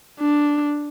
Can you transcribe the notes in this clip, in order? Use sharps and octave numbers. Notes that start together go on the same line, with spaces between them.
D4